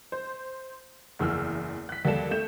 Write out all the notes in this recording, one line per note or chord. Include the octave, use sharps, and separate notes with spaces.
C5
F#1 E2 E6 F6
F#6 B6
D#2 G3 A4 E7
A3 G6 E7